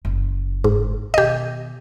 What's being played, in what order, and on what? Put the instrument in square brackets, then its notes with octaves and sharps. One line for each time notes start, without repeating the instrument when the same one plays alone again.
[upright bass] F#1
[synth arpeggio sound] G#2
[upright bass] B2 D#3 [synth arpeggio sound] G4 D#5